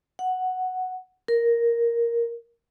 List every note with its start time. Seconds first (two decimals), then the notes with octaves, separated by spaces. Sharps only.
0.19 F#5
1.28 A#4